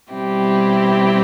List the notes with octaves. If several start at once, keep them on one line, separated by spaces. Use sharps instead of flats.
B2 G3 C4 E4 G4